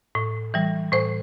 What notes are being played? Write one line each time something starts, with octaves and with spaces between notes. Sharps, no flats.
A2
E3 G3
A2 C5